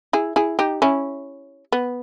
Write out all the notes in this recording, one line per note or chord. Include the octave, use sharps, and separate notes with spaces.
E4 G#4
E4 G#4
D#4 G4
C#4 E4
B3